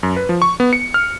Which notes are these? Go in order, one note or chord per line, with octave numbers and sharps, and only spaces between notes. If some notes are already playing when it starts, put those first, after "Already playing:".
F#2
B4
F3
C#6
B3
C#7
F6